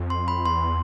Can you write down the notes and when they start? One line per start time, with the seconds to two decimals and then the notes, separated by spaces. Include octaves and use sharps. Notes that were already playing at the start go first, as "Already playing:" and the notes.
Already playing: F2
0.10 C6
0.28 B5
0.45 E2 C6